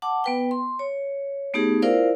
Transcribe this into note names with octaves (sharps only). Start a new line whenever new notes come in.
F#5 A5 D6
B3 B4 G5
C6
C#5
A3 B3 D#4 G4 G#4
E4 F4 A#4 C5 D5 F5